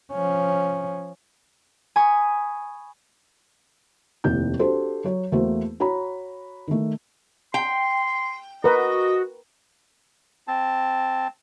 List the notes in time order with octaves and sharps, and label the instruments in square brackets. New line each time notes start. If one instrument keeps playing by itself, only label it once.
[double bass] F3 C#4
[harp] G#5 B5 C#6 D#6
[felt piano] F1 D#2 E4 G6
D4 F#4 G4 A4 C5
F#3 C#5
E2 A3 A#3 F#4 C5
F#4 C#5 A#5 B5
D#3 A3
[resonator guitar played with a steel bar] G5 [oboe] C6
[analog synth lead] F#4 [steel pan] A#4 B4 [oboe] D#5
[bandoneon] C4 A5